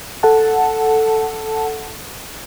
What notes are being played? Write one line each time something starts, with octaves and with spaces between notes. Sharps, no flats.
A4 F#5 A5